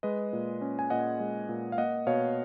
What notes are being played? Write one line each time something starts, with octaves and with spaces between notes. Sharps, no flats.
G#3 B4 D#5
A#2
C#4
G#5
A#2 D#5 F#5
G#3
A#2
F5
A#3 D#5 F#5
B2 C#5 F5